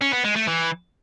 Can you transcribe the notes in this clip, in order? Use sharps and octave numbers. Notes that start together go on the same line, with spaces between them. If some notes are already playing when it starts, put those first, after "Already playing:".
C#4
B3
G#3
A3
E3